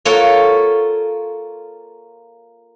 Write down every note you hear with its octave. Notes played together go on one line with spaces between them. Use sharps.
A#3 F4 A4 C#5 F#5